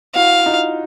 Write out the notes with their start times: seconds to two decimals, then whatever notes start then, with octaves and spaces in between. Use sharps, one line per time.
0.15 E4 F#4 F5
0.46 D#4 F4